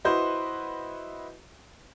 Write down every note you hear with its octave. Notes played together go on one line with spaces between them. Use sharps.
E4 F#4 B4 C5 D#5